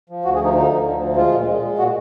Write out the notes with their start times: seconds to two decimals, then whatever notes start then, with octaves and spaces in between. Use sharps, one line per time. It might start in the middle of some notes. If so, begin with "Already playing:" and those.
0.10 F3
0.25 D2 F#4
0.35 G#4
0.39 F3
0.45 D#4
0.55 D3 D#4
0.71 F3
0.86 D2
1.02 F3
1.17 G#3 F4
1.32 A#2
1.48 G#3
1.63 G#3
1.79 A#2 F#4